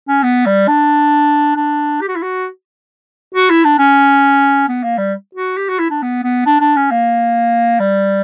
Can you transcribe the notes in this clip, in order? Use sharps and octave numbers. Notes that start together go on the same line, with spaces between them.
C#4
B3
G3
D4
D4
G4
F#4
E4
F#4
F#4
E4
D4
C#4
B3
A#3
G3
F#4
G4
F#4
E4
D4
B3
B3
D4
D4
C#4
A#3
G3